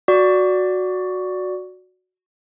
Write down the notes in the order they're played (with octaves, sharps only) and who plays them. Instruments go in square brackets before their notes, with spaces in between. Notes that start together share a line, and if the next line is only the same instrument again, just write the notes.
[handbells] F#4 D5